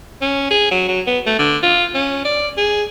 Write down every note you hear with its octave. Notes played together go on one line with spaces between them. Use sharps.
C#4
G#4
F#3
F#3
B3
A3
D3
F4
C#4
D5
G#4